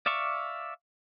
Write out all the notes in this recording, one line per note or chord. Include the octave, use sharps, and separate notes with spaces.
D5 E5 F5 C#6 D6